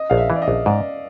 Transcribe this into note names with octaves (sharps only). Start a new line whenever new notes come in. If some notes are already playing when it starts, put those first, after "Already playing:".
Already playing: D#5
A#1 F5
E5
E3
D5
D#5
A#1
G#2 D5